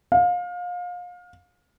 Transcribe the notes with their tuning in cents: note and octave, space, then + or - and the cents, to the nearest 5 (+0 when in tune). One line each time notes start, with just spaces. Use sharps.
F5 +30